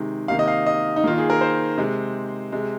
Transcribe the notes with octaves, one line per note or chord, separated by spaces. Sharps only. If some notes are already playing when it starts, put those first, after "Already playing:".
Already playing: C3 D#3 G#3
C3 D#3 A#3 F5
D#5
F5
D#5
D#4
D#3 A#3 F4
G#4
A#4
C5
C3 G#3
C3 G#3